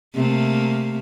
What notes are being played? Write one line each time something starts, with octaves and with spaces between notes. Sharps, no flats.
C3 A3 A#3